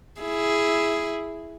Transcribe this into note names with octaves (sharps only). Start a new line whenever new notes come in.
E4 G#4